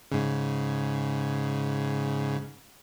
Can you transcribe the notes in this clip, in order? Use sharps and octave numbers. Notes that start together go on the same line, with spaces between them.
G#2 C#3